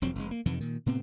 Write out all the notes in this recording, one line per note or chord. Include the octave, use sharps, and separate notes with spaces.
E1 F2 F#3 C4
F1 G#3
A#3
F2 C3 D#3 E3
A#2 D#3
A2 C3 B3 C4